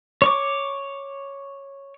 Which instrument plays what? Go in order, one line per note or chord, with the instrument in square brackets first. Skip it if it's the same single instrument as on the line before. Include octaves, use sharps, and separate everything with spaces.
[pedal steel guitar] C#5 C#6 D6